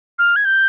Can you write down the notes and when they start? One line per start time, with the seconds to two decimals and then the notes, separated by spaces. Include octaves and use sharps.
0.19 F6
0.36 G#6
0.45 G6